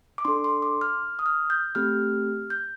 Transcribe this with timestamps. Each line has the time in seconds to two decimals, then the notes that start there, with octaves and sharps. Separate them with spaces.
0.18 D6
0.25 D4 A4 C6
0.44 C6
0.62 D6
0.81 F6
1.19 D#6
1.26 F6
1.50 G6
1.75 A3 C4 G4 F6
2.50 G6